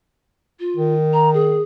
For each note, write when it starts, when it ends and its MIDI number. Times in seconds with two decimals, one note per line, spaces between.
0.59 0.93 65
0.77 1.62 51
1.13 1.31 82
1.33 1.62 68